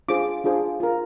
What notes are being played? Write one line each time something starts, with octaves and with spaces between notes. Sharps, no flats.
D4 F4 G#4 C5 D6
D4 F4 G#4 C5
F4 A#4